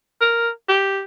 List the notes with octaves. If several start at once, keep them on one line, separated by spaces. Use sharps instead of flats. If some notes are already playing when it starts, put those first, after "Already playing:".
A#4
G4